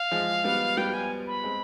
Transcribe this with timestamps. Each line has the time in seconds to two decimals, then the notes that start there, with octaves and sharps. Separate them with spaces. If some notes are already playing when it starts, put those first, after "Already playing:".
Already playing: F5
0.11 F3 G#3
0.44 G3 B3
0.77 G3 B3 G5
0.94 G#5
1.27 B5
1.43 G#3 C4